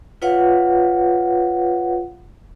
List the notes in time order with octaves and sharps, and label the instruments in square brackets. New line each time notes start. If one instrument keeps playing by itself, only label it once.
[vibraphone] F4 B4 C#5 F5 F#5